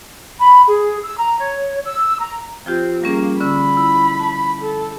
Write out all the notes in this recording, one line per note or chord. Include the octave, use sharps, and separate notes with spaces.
B5
G#4
E6
A#5
C#5
E6
A#5
F3 C4 F4 G4
G3 A#3 C#4 G#4
D3 C#4 B5 E6
E4
A5
A4